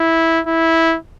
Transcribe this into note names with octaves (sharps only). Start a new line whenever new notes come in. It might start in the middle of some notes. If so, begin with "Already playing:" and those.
Already playing: E4
E4